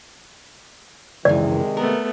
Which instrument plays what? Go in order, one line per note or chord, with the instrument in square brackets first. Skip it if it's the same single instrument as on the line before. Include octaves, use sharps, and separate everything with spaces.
[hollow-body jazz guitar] C#2 F#2 E3 [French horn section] C3 D#3 G#3 [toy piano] D5
[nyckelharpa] A3 B3 [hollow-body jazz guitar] A#4